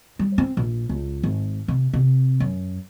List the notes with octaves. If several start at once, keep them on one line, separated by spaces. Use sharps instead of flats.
G3
C4
A#1
C#2
G#1
C3
C3
F#2